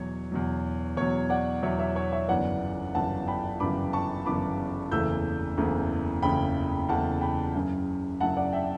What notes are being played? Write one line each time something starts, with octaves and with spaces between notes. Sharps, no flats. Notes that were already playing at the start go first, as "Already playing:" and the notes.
Already playing: E2 B2 F#3 C#5
E2 B2 F#3
E2 B2 F#3 C#5
D5 F#5
E2 B2 F#3 C#5 E5
C#5 E5
C#5
C#5 E5
G1 F#2 C#3 E3 B3 D5 F#5
G1 F#2 C#3 E3 B3 F#5 A5
G5 B5
G1 F#2 C#3 E3 B3 B5 D6
A5 C#6
G1 F#2 C#3 E3 B3 B5 D6
F#1 E2 C#3 E3 A3 E6 G6
F#1 E2 C#3 E3 A3
F#1 E2 C#3 E3 A3 G5 B5
F#1 E2 C#3 E3 A3 F#5 A5
G5 B5
F#2 C#3 F#3 C#4 E4
F#2 C#3 F#3 C#4 E4 F#5 A5
D5 F#5
E5 G5